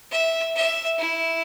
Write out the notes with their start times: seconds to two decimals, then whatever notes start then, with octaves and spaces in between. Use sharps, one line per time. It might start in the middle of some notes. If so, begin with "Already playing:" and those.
0.11 E5
0.56 E5
0.99 E4